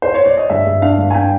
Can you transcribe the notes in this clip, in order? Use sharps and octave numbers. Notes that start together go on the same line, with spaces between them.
C5
C#5
D5
D#5
G2 E5
G2
D4 F5
G2
G#5
D4 G5